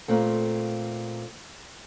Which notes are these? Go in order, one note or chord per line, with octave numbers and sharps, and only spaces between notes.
A#2 A3 C4